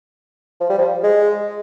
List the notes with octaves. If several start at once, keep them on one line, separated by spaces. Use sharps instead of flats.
F3
G3
F3
G#3